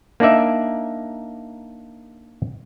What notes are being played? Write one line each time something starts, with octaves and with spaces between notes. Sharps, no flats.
A#3 D4 D#4 D5 E5